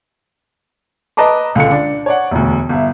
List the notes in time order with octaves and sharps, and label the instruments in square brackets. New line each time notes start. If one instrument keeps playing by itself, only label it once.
[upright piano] B4 D#5 A5 A#5 D6
C#2 D3 C#7
D4
C#5 D5 F#5
E1 D2
G1 E5